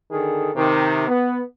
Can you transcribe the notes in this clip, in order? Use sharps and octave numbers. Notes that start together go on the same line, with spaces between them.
D3 D#3 G#4 A4
C3 D#3
B3